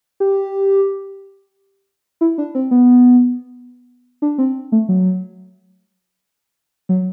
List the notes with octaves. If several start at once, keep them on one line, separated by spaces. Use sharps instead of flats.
G4
E4
D4
C4
B3
D4
C4
A3
F#3
F#3